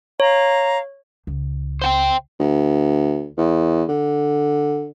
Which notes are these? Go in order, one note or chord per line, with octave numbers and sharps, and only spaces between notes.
C#5 F5 A#5
C#2
C5 F#5 G5
D2
E2
D3